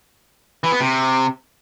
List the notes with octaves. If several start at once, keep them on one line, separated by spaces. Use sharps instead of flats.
E3
B3
C3